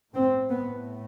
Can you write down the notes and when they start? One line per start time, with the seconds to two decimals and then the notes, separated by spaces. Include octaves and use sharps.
0.13 A2 C4
0.50 B3